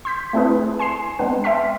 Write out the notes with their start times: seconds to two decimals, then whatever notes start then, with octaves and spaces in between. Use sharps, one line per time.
0.05 C6 E6 G6 B6
0.33 A3 C4 D4 E4 G#4 B4
0.79 G#5 C6 C7 E7
1.19 G#3 B3 C4 D4 B4
1.44 E5 G5 A5 C6 F6 B6